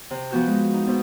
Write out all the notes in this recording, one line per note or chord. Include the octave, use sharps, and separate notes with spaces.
C3
F3 B3 F#4 G6
G#3
D#4
B2 C4